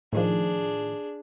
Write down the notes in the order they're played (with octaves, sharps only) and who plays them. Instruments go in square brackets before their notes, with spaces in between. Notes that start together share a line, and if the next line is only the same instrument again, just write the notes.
[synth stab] A2 D#3 F3 [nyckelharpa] D4 G#4